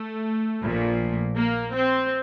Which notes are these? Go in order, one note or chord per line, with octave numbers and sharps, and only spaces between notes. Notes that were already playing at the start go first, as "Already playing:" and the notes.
Already playing: A3
A#1 A#2 F3
A#3
C4